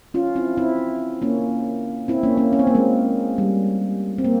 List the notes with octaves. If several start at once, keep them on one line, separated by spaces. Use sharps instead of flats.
C#4 F4
C4 E4
C4 E4
A#3 C#4
C4 E4
A#3 C#4
A#3 C#4
C#4
C4
A#3
G#3 C4
G3
C4
A#3